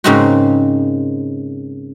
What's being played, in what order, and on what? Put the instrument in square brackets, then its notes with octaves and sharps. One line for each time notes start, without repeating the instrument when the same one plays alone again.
[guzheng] G#2 C#3 A#3 C4 D#4 F#4